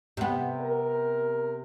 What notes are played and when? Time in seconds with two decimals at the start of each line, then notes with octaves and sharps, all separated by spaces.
0.17 C3 B3
0.61 A#4